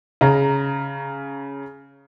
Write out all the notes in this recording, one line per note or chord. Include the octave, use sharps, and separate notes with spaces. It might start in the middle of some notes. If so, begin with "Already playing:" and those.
C#3 C#4 A#5